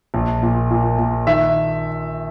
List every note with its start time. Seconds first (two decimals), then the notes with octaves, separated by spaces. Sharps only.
0.14 A#1
0.42 A#2
0.71 A#2
0.98 A#2
1.27 D#3 E5